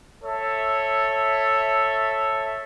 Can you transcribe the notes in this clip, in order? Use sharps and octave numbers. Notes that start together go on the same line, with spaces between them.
A4 C#5 E5